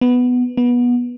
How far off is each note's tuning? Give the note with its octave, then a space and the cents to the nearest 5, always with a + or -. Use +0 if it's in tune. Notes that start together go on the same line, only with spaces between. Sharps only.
B3 +5
B3 -20